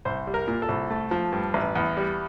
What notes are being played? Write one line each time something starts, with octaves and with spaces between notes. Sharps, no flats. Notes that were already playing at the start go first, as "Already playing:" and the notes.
C2 C5
G3
A#4
A#2
A4
C2
A3
F3
G2
A1
E2
G3